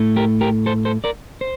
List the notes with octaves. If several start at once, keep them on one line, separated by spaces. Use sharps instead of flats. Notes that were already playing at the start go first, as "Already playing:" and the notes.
Already playing: A2 A3
G4 A#4
G4 A#4
A4 C5
A4 C5
A#4 D5
C5